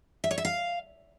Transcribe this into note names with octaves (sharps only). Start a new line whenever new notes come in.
E5
C#5
E5
F5